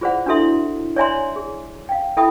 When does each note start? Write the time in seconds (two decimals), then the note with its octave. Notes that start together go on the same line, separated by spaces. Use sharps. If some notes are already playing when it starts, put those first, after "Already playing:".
0.01 F4 G#4 C5 D5 F#5
0.26 D4 E4 F#4 A4 E5 C6
0.96 C#5 D5 E5 G#5 A#5 C6
1.36 G#4
1.89 F5 G5
2.17 E4 A4 E5 G5 B5 D#6